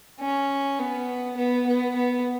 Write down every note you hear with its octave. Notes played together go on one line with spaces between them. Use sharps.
C#4
B3
B3
B3
B3